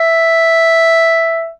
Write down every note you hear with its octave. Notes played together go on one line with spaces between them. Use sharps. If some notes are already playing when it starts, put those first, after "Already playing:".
Already playing: E5